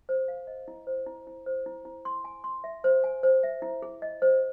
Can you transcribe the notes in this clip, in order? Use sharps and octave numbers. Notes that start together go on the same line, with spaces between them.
C5
F5
D#5
E4
C5
E4
E4
C5
E4
E4
C6
G#5
C6
E5
C5
G#5
C5
E5
E4
G#4
D#5
C5